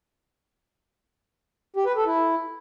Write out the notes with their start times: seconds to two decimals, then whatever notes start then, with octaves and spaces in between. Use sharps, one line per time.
1.76 G4
1.86 B4
1.96 A4
2.06 E4